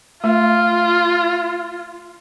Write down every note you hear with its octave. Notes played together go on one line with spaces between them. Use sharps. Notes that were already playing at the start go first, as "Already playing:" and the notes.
A3 F4 E5